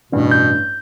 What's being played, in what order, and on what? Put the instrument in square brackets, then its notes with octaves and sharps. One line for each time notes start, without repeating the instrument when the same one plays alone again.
[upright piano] A1 G2 [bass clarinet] B2
[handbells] G6